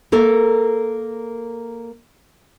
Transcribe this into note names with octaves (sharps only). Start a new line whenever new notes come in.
A#3 A4 A#4